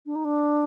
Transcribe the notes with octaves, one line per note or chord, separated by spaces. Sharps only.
D4
D#4
D4